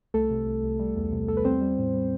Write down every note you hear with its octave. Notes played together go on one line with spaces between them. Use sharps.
C2 A3 A4
C3
C2
C2
G3
E2
C3
E2 A4
B4
G3 C4 C5
G3
A2
G3